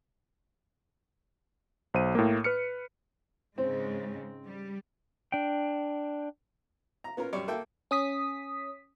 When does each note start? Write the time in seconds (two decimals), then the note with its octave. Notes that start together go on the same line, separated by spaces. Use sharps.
1.94 B1 C5 D#7
2.15 A2 A#3
2.44 B4 F6 C#7
3.58 G#2 C#3 G#3 C4
4.45 G3
5.32 D4 G5
7.04 A#5
7.17 B3 C#4 F4 A#4
7.33 F#2 G3 C#5 D5
7.48 A#3 A4 E5 G5
7.91 C#4 D#6 B6